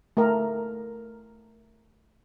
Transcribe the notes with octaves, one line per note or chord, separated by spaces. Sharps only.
A3 A#4